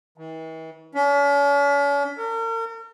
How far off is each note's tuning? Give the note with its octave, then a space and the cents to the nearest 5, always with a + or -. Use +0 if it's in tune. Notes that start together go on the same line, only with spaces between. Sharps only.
E3 -45
C#4 +45
A#4 -40